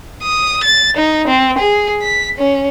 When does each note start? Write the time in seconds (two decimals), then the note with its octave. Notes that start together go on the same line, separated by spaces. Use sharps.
0.23 D#6
0.63 A6
0.96 D#4
1.28 C4
1.58 G#4
2.02 B6
2.38 C#4